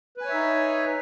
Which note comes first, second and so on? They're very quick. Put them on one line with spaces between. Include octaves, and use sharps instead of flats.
B4 G#5 C#5 E5 D#4